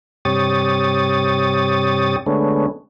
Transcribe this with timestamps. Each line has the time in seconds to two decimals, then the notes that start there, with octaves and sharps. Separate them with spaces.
0.25 G2 C3 G4 C#5 D#6 A6
2.26 D3 G#3 A3 B3 C#4